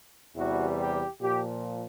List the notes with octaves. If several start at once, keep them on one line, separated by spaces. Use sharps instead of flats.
E2 C3 E3 G3 F#4
G4
A#2 F3 G4